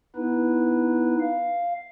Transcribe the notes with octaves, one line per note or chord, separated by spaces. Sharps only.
B3 D#4 E4 B4
F5